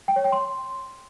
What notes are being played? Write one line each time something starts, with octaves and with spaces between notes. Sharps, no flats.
G5
C#5
G5
C6